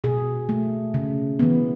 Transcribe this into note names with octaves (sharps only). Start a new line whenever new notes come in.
B2 G#4
A3
C#3
E3 B3